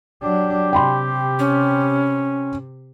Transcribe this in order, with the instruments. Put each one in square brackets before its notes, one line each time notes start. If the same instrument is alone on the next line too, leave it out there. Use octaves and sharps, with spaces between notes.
[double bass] F#3 D4 [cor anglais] G4
[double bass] C3 [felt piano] G5 B5 C6
[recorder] C#4